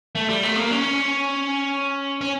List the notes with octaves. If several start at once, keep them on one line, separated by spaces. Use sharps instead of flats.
A3
G3
A3
A#3
C#4
C#4